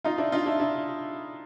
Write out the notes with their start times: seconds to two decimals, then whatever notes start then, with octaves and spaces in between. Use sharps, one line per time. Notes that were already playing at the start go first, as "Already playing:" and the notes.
0.04 D#4 F4
0.18 D4 E4
0.32 D#4 F4
0.46 D4 E4
0.60 D4 E4